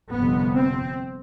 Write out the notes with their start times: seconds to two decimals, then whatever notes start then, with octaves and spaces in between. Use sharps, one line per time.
0.11 G1 F2 C3 B3
0.55 C4